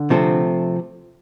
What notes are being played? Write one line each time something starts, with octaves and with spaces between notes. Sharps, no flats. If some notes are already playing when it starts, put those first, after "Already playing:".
Already playing: D3
C3 F3 A3 C4